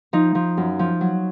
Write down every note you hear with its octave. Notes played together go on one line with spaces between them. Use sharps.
F3 D#4
F3
F#2
F3
F#3